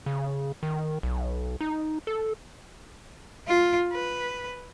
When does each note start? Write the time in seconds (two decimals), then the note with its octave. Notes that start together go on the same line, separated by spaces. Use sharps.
0.06 C#3
0.63 D#3
1.03 B1
1.61 D#4
2.07 A4
3.47 F4
3.93 B4